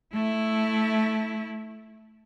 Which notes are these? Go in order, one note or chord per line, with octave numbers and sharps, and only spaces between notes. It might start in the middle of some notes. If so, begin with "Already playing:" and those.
A3 E4